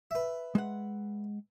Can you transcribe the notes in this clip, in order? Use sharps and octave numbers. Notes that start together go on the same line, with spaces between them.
B4 E5
G#3 F#5